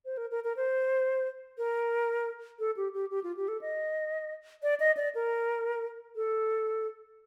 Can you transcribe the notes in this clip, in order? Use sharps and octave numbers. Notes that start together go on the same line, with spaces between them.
C5
A#4
A#4
A#4
C5
A#4
A4
G4
G4
G4
F4
G4
A4
D#5
D5
D#5
D5
A#4
A4